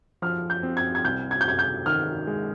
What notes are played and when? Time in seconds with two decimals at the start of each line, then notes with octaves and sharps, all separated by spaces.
0.22 F3 F6
0.50 G6
0.63 C4
0.77 G#6
0.95 G#6
1.04 C2 G6
1.31 G#6
1.41 G6
1.45 C3 G#6
1.59 G6
1.86 D#3 F6
2.27 G#3